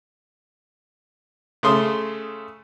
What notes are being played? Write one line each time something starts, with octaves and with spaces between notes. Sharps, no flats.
C#3 A3 C6 D#6